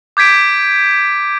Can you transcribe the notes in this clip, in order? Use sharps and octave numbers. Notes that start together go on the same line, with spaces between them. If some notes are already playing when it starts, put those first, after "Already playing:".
D6 G6 G#6 B6 D7